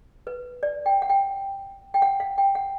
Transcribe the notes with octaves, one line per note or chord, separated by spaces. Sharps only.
B4
D5
G5
F#5
G5
G5
F#5
F5
G5
F#5